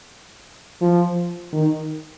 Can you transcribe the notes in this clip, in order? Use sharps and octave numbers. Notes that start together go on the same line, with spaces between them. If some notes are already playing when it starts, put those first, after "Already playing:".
F3
D#3